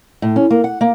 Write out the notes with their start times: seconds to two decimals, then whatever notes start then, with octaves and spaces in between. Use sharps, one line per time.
0.22 A2
0.36 C#4
0.50 A#3
0.64 F#5
0.81 A#3